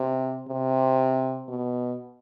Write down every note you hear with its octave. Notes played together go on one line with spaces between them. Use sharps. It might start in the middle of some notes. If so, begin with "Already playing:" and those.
Already playing: C3
C3
B2